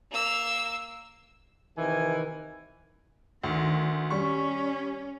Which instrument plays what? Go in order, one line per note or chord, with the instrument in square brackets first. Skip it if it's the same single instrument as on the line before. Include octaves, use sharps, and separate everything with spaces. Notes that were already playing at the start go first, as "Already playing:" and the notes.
[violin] A#3 E6
[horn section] C3 D#3 E3 G#5
[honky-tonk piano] D2 [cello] D#3
[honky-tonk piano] G3 C#6 [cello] C#4